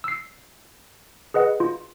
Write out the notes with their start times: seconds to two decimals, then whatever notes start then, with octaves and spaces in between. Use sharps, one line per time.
0.04 E6 C7
1.34 G#4 B4 D#5 F#5
1.60 F4